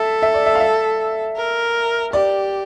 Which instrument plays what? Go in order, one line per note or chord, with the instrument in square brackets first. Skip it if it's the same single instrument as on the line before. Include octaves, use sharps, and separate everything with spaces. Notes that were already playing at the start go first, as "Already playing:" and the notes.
Already playing: [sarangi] A4 [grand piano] E5
[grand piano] E5
D5
E5
F5
E5
[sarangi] A#4
[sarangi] G4 [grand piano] D5